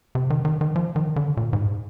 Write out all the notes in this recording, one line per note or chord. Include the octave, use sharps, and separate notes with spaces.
C3
D#3
D#3
D#3
F3
D#3
D3
A#2
G#2